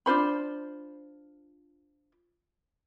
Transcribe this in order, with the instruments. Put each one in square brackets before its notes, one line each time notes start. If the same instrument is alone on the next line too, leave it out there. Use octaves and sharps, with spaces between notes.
[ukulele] D4 F4 C5 B5